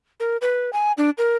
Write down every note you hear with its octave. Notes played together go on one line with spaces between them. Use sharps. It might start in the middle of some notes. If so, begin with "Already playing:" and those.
A#4
B4
G#5
D4
A#4